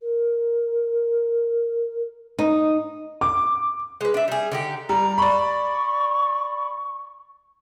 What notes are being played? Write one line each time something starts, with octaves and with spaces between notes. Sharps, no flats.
A#4
D#4
D6
G#3 B4
D4 E5
G3 G#4
D3 D#4 G4
G3 A#5
D5 B5 C#6